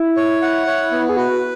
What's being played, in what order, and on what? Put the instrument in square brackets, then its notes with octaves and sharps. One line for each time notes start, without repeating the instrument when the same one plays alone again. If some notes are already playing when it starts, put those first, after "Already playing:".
Already playing: [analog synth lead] E4
[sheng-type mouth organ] C#5
F#5
C#5
B3
[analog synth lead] G#4
[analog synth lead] F#4 [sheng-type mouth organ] B4